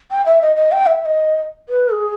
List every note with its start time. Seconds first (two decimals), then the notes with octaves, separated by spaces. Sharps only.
0.11 G5
0.26 E5
0.42 D#5
0.56 D#5
0.72 G5
0.86 E5
1.01 E5
1.06 D#5
1.69 B4
1.92 G#4